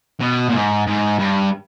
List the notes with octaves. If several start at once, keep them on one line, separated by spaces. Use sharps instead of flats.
B2
A#2
G#2
G#2
G2